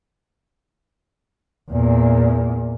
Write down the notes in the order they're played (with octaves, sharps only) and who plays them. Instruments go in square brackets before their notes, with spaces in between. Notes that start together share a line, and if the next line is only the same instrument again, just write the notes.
[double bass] E2 A#2